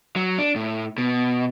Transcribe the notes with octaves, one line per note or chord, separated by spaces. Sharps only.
F#3
D4
A2
B2